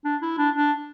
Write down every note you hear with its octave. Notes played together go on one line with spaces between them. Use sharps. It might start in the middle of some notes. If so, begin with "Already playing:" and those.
D4
E4
D4
D4